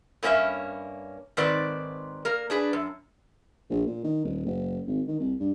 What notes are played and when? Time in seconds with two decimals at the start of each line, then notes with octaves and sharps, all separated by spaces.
0.23 G2 A#3 C#4 G4 E5
1.37 G#2 D#3 C4 B4 D5
2.25 A#3 A#4
2.50 D4 G#4 B4
2.73 F#2
3.70 A#1
3.87 A#2
4.04 D#3
4.24 D#1
4.46 F#1
4.87 G#1
5.08 D#3
5.20 C2
5.40 G2